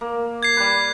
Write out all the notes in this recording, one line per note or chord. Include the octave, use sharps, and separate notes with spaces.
A#3
G#6 C7
G3 B4